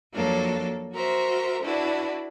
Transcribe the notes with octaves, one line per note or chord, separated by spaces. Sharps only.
F2 F#3 A#3 D4 A4 C#5
F#4 A#4 C5 E5
D4 E4 F#4 B4